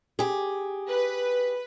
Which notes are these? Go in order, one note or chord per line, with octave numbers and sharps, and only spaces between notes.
G4 G#4
B4